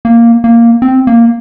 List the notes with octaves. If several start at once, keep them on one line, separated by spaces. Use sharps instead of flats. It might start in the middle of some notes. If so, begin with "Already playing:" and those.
A#3
A#3
C4
A#3